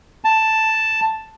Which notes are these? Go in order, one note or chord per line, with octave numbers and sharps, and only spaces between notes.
A5